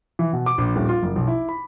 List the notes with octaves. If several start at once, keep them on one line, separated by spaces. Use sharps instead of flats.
E3
B2
D6
A#1
D#1
F4
F#1
B1
E4
B5